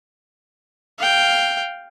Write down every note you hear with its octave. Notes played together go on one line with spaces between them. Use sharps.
F5 G5